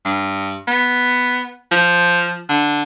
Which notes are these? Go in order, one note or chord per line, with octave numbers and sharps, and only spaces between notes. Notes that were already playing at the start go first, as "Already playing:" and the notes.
G2
B3
F3
D3